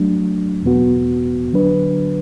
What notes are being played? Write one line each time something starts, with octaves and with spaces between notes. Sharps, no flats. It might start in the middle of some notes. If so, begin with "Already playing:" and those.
Already playing: F#3 A3 D4
E2 B2 B3 F#4
D3 F#3 D4 B4